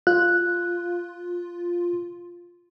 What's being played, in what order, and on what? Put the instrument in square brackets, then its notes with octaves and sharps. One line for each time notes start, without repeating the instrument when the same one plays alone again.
[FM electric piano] F4 [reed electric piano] F#6